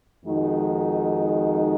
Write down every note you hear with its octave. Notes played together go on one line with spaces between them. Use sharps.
F2 D#3 G#3 D#4 F#4